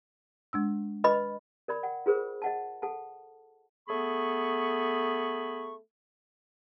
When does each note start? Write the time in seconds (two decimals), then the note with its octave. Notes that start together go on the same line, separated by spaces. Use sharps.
0.53 G#3 D4 E6
1.04 B4 D#5 B5
1.68 A#4 D5 B5
1.83 F#5 G5
2.06 F4 G#4 A#4 C5
2.42 D#5 F#5 A5
2.82 A4 F#5 A5
3.88 A3 B3 G#4 B5 C#6